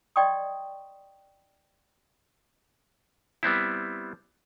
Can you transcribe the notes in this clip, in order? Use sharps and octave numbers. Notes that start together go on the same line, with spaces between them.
D5 D#5 G5 C6 C#6 D#6
G3 B3 C4 E4